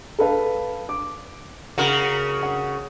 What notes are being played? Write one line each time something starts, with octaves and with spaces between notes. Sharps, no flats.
A4 B4 F5
D6
C#3 F#4 A#4 F#5
F#5